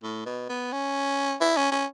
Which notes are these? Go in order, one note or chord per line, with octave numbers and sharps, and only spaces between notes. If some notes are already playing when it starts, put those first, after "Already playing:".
A2
B2
B3
C#4
E4
C#4
C#4